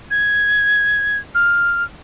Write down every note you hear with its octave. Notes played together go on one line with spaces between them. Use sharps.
G#6
F6